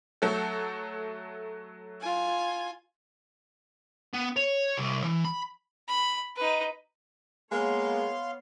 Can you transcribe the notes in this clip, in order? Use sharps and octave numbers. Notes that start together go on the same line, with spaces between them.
F#3 A3 A4
F4 G#5
B3
C#5
C2
E3
B5
B5
D#4 B4
G#3 A#3 B3 C#5 F5 C6